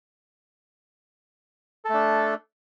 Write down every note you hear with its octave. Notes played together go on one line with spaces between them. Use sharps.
A3 D4 A4